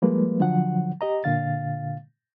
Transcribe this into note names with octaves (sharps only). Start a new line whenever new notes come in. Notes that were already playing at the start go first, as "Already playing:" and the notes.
F3 G3 G#3 A#3 B4
D3 F3 F#3 F#5
G4 D#5 A#5
A#2 D3 F5 A6